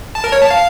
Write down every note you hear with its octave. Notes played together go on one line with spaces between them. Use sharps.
A5
A#4
C#5
A5
F5